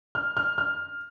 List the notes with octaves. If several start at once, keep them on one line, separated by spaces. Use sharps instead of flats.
F6
F6
F6